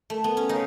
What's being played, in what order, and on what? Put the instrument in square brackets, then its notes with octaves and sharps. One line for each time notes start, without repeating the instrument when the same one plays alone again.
[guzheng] A3
B3
C#4
[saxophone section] C#3 [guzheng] D#4